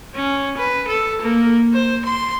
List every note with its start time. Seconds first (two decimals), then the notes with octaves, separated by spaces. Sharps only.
0.15 C#4
0.57 B4
0.88 A4
1.22 A#3
1.74 C5
2.06 C6